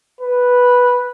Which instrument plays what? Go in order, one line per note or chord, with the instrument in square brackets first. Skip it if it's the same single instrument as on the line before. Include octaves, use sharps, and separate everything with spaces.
[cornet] B4